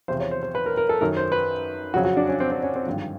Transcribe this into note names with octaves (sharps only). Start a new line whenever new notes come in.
E2 C3 F3 C5
C#5
C5
C5
B4
A#4
A#4
A4
F#2 D#3 F#3 A#4
C5
B4
F2 C#3 F#3 F#4
F#4
D4
C#4
C4
C4
C#4
C4
G#1 G2 D3 F3